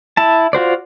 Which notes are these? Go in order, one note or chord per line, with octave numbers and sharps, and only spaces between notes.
E4 A5
F4 F#4 C5 D5